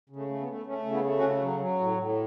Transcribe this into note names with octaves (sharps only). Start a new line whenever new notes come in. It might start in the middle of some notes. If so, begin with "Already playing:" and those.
C#3
A3
A3
B3
A3
A3 C#4
C#3
B3 E4
A3
C#4 F#4
C#3
F#3
F#3
A2
A2